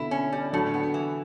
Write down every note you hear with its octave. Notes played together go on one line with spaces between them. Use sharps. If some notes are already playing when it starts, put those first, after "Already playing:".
Already playing: B2 D3 E4
C#4
G3
A2 D3 F#3
B3
E3